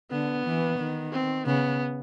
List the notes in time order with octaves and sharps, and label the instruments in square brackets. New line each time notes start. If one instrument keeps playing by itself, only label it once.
[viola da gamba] D3 [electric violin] B3
[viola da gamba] E3
D#3
[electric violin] C4
[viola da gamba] C#3 [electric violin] B3